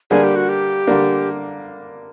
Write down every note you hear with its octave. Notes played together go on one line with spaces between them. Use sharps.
D3 G3 A#3 D4 G#4
G4
F#4
G4
D3 G3 A#3 D4